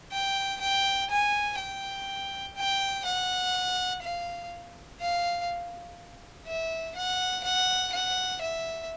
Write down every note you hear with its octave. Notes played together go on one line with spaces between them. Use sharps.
G5
G5
G#5
G5
G5
F#5
F5
F5
E5
F#5
F#5
F#5
E5